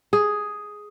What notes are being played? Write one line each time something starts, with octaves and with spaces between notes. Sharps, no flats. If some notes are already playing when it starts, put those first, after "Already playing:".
G#4